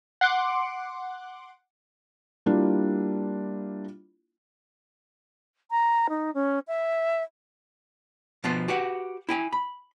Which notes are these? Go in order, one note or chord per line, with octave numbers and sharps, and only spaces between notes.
F#5 C6 D6 F#6 D7
G3 A#3 D4 E4 F4
A#5
D#4
C#4
E5
B2 F3 B3 C5
F#4 G4 B4 F#5
E4 G5 G#5
B5